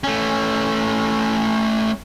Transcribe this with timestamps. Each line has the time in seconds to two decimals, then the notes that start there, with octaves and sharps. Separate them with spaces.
0.04 A3 C#4